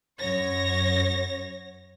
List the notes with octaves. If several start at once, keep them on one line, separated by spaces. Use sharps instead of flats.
F#2 C#5 A#6